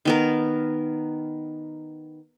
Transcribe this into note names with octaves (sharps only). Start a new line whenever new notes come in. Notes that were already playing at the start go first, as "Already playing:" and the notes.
D#3 B3 A#4